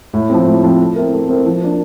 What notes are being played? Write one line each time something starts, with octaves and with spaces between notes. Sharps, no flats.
A2
F3 C4
A2
F3 C4
A3
C4 E4 A#4
A3
C4 E4 A#4
F3
A#3 D4